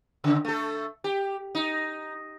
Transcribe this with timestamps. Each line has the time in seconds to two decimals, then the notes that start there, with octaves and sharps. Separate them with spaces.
0.24 C#3
0.45 A3 A4
1.04 G4
1.55 D#4